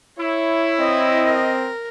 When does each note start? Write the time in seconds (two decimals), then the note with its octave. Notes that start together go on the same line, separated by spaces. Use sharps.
0.19 E4 C#5
0.79 C4 D#5
1.25 A#4